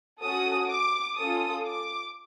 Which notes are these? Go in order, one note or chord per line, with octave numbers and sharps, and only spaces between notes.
C#4 F#4 A4 D#6
D6
C#4 F4 A4 D#6
D6